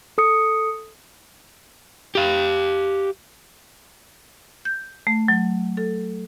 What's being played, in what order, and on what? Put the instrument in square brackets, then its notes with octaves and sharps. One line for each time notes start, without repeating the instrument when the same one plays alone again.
[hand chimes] A4 D#6 C#7
[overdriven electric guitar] G4 F5
[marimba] G6
A3
F#3
A4